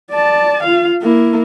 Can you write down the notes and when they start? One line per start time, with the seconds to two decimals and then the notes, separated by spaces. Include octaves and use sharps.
0.11 D5 A5
0.63 F4 F5
1.03 A#3 E4